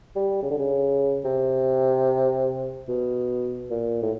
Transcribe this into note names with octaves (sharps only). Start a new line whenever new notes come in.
G3
C#3
D3
C#3
C3
B2
A#2
A2